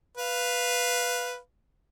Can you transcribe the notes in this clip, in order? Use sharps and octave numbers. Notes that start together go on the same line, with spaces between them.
B4 F5